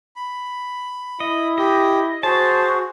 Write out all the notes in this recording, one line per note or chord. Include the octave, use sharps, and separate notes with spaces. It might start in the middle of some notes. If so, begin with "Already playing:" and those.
B5
E4 D#5
G4 D#5
F#4 G#4 C5 A5